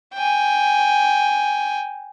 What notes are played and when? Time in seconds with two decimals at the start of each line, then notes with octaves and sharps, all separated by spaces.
0.14 G5 G#5